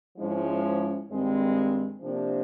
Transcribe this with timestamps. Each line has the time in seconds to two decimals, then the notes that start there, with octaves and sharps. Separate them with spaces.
0.17 G#2 F3 G#3 C#4 E4
1.10 G2 D#3 G#3 C4
2.01 C3 F3 A#3 D4